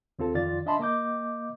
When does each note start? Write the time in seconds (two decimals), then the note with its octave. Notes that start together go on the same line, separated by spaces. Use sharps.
0.19 D#2 C4 F4 A4
0.34 C2 F2 D#3 F4 D5 A6
0.66 D4 D#5 E5 A5 B5 C6
0.79 A#3 D#5 D6 G6